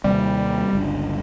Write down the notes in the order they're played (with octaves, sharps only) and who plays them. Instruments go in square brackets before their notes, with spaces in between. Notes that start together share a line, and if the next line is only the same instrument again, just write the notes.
[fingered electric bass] D#2 C3 C4 [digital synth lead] G3
[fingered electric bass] G1 C#2 D4